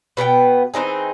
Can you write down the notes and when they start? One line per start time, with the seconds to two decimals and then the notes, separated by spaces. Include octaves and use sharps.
0.17 B2 B3 G4 G5
0.74 E3 C4 D#4 G#4